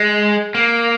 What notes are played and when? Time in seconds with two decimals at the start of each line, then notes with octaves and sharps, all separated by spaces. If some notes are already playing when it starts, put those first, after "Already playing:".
Already playing: G#3
0.55 A#3